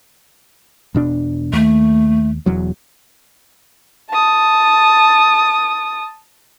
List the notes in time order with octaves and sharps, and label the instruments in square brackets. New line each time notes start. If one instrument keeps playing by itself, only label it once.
[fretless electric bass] E1 B2 D4
[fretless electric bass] D#2 [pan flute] A3
[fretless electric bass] E1 E2 F#3
[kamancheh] A5 D#6